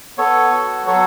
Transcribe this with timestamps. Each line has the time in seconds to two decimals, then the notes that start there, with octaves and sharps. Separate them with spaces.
0.18 B3 A4 C#5
0.52 F#4
0.87 F#3 A4 C#5